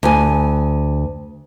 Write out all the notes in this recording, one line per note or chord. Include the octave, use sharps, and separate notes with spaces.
D2 G#5